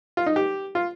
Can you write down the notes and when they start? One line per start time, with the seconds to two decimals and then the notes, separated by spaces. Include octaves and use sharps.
0.17 F4
0.26 D#4
0.36 G4
0.75 F4